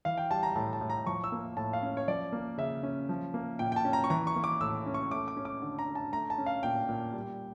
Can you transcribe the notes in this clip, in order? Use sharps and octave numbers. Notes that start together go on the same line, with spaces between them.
E3 F5
G5
G3 A5
A#5
A2 A5
A5
A2
A#5
F3 C#6
E6
A#3
A2 A5
F5
C#4
C#5
F3 D5
A#3
C#3 E5
C#4
F3
A#3
A#2 G5
G5
A5
C#4
A#5
C#6
E3 A#5
C#6
A#3
D6
A2 E6
C#4
C#6
A3 D6
D6
C#4
D6
D3
A#5
D3
A5
A3 A#5
A5
C#4
F5
A#2 G5
A#2
G3